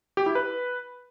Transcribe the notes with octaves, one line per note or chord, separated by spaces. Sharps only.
G4
E4
B4